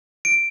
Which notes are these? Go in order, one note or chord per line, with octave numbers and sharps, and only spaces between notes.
D7